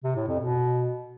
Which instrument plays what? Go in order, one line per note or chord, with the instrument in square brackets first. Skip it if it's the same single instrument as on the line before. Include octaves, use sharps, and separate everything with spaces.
[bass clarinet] C3
A2
F2
B2